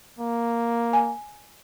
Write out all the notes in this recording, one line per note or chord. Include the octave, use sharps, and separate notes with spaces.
A#3
G#5